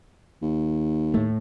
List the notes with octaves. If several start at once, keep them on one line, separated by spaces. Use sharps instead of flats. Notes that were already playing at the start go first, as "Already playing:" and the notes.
D#2
A2 A3